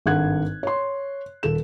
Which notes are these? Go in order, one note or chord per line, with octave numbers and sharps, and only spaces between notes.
G#1 G2 A4 F#5 F#6 G#6
C#5 C6
D#1 A4 E7